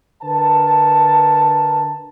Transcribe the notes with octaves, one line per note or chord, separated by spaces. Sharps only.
D3 A#4 B4 A5